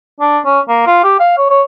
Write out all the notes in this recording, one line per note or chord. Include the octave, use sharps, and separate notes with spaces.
D4
C#4
A#3
F4
G4
F5
C#5
C#5